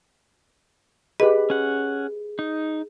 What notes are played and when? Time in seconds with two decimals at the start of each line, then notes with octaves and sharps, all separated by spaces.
1.20 G4 G#4 B4 D#5 B5
1.50 C#4 F#5
2.39 D#4